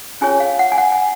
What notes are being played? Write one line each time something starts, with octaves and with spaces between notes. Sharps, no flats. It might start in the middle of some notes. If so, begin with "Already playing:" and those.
C#4 F4 G#4 C#5 G#5
F5
F#5
G#5
F#5
G#5